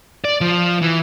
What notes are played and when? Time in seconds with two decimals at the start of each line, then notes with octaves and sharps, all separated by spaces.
0.25 D5
0.41 F3
0.82 E3